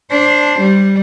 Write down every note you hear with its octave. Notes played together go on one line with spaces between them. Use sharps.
D4 C5
G3